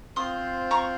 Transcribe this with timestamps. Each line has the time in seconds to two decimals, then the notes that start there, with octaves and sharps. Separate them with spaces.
0.16 C4 F4 C5 C6 D#6
0.71 A#5 C#6